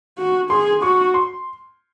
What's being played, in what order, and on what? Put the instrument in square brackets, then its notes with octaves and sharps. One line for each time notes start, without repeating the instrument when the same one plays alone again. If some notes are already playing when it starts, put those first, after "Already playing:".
[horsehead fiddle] F#4
[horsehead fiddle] G#4 [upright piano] C6
[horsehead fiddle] F#4 [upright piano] C#6
[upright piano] C6